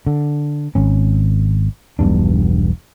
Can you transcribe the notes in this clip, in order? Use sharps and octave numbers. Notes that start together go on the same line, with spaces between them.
D3
G#1 C#4
E1 B1 G2 D4